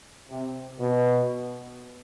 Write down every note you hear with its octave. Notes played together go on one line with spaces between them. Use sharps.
C3
B2